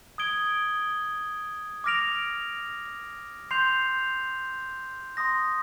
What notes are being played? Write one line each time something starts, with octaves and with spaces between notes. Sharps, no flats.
D#6 G#6 D7 G7
D6 F6 A#6 D7 F7
C6 G6 C7 F7
C6 D#6 A#6